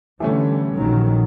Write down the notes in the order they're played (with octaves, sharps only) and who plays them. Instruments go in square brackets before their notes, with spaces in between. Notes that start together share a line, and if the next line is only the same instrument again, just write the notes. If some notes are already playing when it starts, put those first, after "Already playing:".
[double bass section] D3 G3 [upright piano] E3 A3 C#4
[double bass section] A#1 D#3 F#3